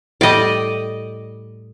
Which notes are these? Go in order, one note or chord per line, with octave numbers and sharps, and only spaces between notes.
A2 G3 D5 D#5